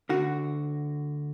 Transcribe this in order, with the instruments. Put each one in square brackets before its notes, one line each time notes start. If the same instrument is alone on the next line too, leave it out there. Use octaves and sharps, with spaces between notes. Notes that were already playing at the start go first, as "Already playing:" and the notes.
[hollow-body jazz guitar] D2 D3 F#4